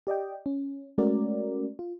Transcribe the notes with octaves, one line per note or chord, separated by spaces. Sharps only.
G4 D5 D#5 G5
C#4
G#3 A3 C#4 F#4 A#4 D5
F4